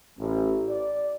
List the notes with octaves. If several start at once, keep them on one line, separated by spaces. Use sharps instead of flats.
A1
D5